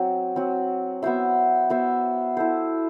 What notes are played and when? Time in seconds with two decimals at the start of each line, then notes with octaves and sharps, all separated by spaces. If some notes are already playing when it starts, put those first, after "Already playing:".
Already playing: F#3 C4 F#4
0.36 F#3 C4 F#4
1.03 B3 F#4 C5 E5
1.70 B3 F#4 C5 E5
2.37 E4 A4 C5